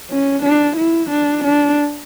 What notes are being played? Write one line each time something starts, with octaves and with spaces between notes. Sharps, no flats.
C#4
D4
E4
D4
D4